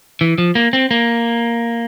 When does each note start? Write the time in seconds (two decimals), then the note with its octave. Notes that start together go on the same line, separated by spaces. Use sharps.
0.21 E3
0.38 F3
0.55 A#3
0.73 C4
0.91 A#3